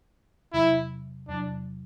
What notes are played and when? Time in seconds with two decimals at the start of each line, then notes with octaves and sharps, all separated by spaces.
0.53 E2 C3 F#3 E4
1.28 E2 C3 F#3 D4